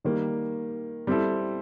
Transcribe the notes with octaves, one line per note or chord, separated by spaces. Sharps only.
D#3 G3 A#3
G3 C4 E4 A4